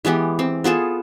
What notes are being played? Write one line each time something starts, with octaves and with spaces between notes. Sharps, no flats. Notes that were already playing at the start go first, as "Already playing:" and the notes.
E3 G#3 B3 G4
C4
B3 F4 G#4 A4